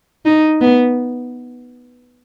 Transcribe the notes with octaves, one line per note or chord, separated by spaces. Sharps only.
D#4
B3